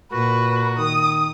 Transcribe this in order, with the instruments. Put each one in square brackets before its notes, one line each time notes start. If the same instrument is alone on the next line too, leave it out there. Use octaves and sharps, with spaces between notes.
[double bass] A#2 [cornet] F#4 [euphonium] A#4 [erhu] B4
[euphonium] D#3 [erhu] D#6